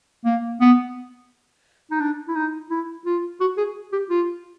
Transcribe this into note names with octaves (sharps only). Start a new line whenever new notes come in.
A#3
B3
D#4
D4
E4
D#4
E4
F4
F#4
G#4
G4
F4